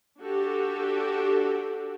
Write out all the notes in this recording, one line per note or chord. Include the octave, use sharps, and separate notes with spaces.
D4 F#4 G4 A4